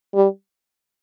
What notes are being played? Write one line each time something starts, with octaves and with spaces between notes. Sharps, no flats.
G3